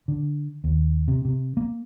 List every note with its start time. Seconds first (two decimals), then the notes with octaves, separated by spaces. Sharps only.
0.08 D3
0.64 D#2
1.08 C3
1.25 C3
1.57 A#3